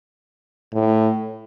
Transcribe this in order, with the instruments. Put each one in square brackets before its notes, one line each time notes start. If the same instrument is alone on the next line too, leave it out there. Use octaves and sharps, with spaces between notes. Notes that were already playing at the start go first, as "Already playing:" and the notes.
[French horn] A2